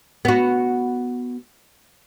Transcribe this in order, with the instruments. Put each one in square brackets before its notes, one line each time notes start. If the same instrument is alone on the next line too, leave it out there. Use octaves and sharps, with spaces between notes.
[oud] B3 F#4